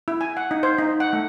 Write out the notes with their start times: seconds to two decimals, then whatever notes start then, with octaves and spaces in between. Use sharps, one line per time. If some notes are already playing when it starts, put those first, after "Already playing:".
0.08 E4
0.21 G#5
0.37 F#5
0.51 D#4
0.63 C5
0.78 D#4
1.00 F#5
1.13 A3